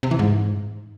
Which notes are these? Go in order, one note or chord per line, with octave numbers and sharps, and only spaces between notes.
C3
E3
G#2